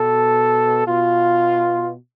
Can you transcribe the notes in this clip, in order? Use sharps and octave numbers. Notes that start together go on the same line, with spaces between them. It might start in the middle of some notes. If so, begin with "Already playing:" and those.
Already playing: B2 A4
B2 F4